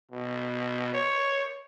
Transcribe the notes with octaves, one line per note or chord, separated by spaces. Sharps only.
B2
C#5